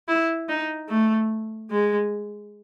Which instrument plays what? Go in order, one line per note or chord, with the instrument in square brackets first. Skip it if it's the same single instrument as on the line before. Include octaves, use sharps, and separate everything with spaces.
[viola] E4
D#4
A3
G#3